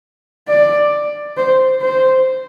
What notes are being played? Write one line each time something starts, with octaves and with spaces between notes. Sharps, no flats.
D5
C5
C5